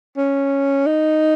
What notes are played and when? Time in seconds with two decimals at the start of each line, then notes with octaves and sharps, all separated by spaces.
0.17 C#4
0.87 D#4